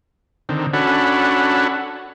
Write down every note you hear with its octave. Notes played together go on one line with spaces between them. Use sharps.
D3 D#3 C4
C#4 D4 F#4 A4 F#5 B5